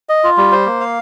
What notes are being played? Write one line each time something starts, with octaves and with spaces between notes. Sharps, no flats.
D#5
F4
G3
C5
A#3
F5